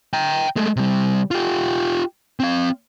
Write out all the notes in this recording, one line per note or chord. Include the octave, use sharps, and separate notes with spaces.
G5 A#5
G#3 A3
C3 G3
F4 G4
C4 F5